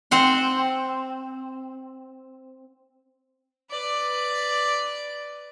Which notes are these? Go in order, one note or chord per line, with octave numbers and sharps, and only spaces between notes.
C4 F#5 C6
B4 D5